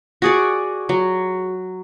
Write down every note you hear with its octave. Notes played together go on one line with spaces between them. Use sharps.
F#4 G#4 D5
F#3